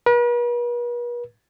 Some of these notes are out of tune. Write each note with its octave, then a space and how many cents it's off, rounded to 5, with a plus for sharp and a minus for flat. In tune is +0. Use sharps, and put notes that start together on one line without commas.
B4 -45